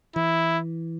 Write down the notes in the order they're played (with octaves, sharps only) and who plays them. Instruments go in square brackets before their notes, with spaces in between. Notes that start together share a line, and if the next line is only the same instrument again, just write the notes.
[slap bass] E3 [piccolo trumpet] E4